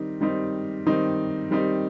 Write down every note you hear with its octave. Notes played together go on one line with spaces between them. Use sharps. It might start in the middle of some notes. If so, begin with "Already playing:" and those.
Already playing: D#3 G3 C4 D#4
D#3 G3 C4 D#4
D#3 G3 C4 D#4
D#3 G3 C4 D#4